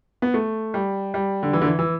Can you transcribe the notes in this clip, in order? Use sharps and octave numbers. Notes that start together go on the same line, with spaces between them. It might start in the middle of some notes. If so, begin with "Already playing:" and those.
B3
A3
G3
G3
D3
E3
D3
E3
E3